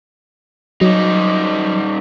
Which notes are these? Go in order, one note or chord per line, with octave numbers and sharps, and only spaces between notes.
F#3 G3 D#4